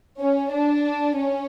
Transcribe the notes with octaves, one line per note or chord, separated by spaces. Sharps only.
C#4
D4
C#4